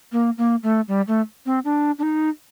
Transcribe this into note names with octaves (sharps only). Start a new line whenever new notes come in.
A#3
A#3
A3
G3
A3
C4
D4
D4
D#4